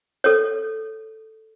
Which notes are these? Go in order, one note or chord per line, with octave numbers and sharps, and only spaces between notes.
A4 C#5